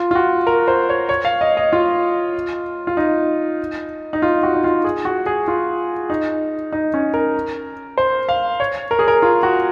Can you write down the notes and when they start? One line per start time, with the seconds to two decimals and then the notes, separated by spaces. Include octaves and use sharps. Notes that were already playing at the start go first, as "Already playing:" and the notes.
Already playing: F4
0.11 F4
0.15 F#4
0.47 A#4
0.68 C5
0.89 C#5
1.09 C#5
1.25 F5
1.41 D#5
1.57 D#5
1.73 F4
2.87 F4
2.97 D#4
4.13 D#4
4.22 F4
4.43 F#4
4.54 D#4
4.64 F4
4.84 G#4
5.05 F#4
5.26 G#4
5.48 F4
6.10 D#4
6.72 D#4
6.94 C#4
7.14 A#4
7.98 C5
8.29 F5
8.60 C#5
8.91 A#4
8.99 G#4
9.08 A#4
9.22 F4
9.43 F#4